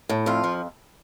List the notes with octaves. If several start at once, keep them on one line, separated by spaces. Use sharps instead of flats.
A2
F2 F4
F3